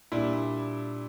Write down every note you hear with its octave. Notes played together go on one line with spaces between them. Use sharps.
A#2 G3 D4 E4